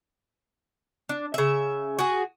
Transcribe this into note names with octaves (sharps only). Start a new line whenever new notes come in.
D4
C#3 E5
F#4 G#4